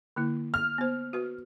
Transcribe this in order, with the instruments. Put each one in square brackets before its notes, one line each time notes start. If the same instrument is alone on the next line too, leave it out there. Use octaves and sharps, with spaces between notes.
[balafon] D3 A#3 E4
[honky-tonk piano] F6
[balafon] B3 C5
F#4 B4